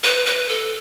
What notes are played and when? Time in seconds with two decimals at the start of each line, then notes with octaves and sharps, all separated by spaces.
0.03 B4
0.26 B4
0.49 A4